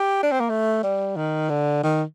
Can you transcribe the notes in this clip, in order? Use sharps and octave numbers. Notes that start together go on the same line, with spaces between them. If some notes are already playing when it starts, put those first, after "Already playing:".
Already playing: G4
D4
C4
A#3
A3
G3
D#3
D3
D#3